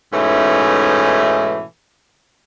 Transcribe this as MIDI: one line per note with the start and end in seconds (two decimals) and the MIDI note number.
0.12 1.62 44
0.12 1.62 47
0.12 1.62 52
0.12 1.62 57
0.12 1.62 61
0.12 1.62 63